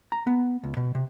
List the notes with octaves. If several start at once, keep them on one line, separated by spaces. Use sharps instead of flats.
A#5
B3
C#2
B2
C3